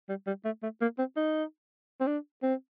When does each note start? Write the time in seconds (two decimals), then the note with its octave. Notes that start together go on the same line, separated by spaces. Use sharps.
0.09 G3
0.27 G3
0.45 A3
0.63 A3
0.81 A#3
0.98 C4
1.16 D#4
2.00 C4
2.07 D4
2.42 C4